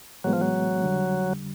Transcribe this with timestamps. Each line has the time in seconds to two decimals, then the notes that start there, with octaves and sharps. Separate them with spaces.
0.24 A2 E3 F#3 G#3 B3
0.33 F3
0.41 F#3
0.84 F2 D3 G3